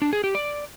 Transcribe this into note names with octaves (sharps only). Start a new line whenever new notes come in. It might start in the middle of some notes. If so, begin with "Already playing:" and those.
D4
G#4
G4
D5